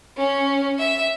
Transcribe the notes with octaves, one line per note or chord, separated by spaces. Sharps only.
C#4
E5